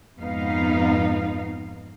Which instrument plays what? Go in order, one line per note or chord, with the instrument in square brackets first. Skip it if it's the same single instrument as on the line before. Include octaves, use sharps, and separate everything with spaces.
[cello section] F2 G#2 B3 D#4 F5